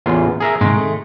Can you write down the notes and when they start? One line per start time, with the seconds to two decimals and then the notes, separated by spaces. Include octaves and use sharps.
0.06 A1 E2 F4
0.40 G#4 A#4 E5
0.61 G#2 C3 D#3 G#3
0.76 A3